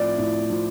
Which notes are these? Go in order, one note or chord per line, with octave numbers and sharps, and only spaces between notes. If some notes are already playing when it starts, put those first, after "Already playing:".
Already playing: A2 F3 D5
A2
F3